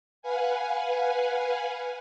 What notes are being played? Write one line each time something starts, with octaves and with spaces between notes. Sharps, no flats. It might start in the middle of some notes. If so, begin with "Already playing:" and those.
B4 F5 F#5 G#5